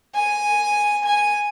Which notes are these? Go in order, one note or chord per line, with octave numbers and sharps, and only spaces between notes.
G#5
G#5